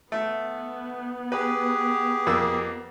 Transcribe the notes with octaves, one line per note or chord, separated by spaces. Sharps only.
A3 B3
G4 G#4 B4
F2 A#3 E6